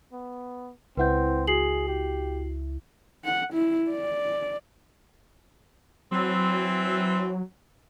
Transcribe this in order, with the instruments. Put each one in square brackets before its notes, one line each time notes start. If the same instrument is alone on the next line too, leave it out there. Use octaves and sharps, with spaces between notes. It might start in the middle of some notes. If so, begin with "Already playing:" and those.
[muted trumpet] B3
[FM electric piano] C#2 E4 [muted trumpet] C4 [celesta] B4 F#5 G6
[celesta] F#4 C7 F#7 [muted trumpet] G#4
[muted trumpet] G4
[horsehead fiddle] F#5
E4
D5
[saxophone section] E3 C4 [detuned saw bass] F#3